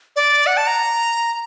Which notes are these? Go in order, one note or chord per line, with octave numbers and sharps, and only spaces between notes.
D5
F#5
A5
A#5